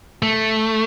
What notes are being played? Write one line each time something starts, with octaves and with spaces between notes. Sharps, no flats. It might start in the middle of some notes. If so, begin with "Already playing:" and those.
A3